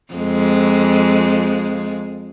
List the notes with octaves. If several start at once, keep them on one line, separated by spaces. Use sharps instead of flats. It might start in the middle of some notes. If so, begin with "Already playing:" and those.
F2 G#3